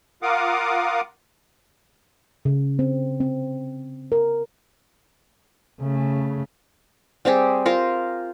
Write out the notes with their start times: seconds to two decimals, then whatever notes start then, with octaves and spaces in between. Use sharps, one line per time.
0.22 F4 A#4 F5 F#5 D6 D#6
2.45 C#3
2.79 C4
3.20 C4
4.12 A#4
5.80 C#3 A3
7.25 G3 C4 G4 G#4
7.66 F4 A#4 C5